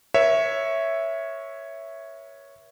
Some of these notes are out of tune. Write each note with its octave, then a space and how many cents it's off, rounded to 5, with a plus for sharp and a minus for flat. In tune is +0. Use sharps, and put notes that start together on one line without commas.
A#4 +45 C#5 +0 E5 +0